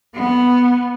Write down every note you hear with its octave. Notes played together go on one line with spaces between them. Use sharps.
B3